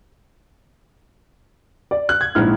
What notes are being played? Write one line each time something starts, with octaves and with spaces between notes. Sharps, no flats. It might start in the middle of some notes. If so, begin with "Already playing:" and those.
D5
F#6
G#6
A#1 G#2 E4 F6